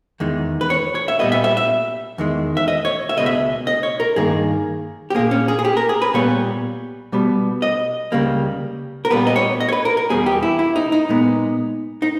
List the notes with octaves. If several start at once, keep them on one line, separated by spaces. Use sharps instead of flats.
E2 D#3 G#3
B4
C#5
C#5
E5
A#2 G3 B3 D#5
E5
E5
E5
E2 D#3 G#3
E5
D#5
C#5
E5
C#2 B2 G#3 D#5
E5
D#5
C#5
A#4
G2 D#3 A#3 G#4
G4
A#2 A#3 G#4
C#4
G#4
G#4
G4
A#4
G#4
B4
A#2 G3 B3 C#5
B2 G3 B3
D#5
C#2 C#3 G3 A#3
A#4
A#2 G3 B3 B4
D#5
C#5
D#5
C#5
B4
A#4
A#4
E2 B2 G3 B3 G#4
G4
E4
E4
D#4
D#4
A#2 G#3 B3
D#4